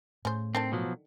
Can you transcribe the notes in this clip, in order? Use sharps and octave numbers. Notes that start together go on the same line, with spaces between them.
A2 C#3 C5
D3 D#3 C4 A5
B2 F3 F#3